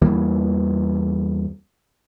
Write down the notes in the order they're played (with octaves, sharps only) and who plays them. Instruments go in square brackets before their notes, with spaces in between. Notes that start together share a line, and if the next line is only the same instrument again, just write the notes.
[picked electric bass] E2 E3 G3 A#3